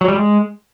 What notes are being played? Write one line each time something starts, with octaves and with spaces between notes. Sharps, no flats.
F#3
G3
G#3